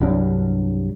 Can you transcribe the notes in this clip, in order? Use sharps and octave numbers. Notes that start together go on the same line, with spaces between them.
C2 G2 F#3 D4